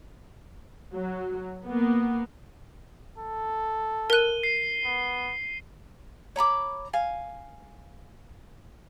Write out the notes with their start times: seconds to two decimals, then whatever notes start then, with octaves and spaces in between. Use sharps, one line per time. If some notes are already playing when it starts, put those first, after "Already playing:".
0.94 F#3
1.64 A#3 B3
3.18 A4
4.10 A#4 F#6 D#7 G7
4.43 C7
4.85 B3
6.36 C#5 A#5 B5 D6
6.93 F5 G#5